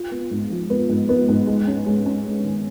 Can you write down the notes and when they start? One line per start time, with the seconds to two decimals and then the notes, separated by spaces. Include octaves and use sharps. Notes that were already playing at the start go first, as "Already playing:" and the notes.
Already playing: F4
0.11 B3
0.31 G#2
0.50 F3
0.70 B3
0.89 G#2
1.09 B3
1.28 G#2
1.47 G#3
1.67 C#4
1.86 G#3
2.06 C#4
2.26 G#3
2.45 D#3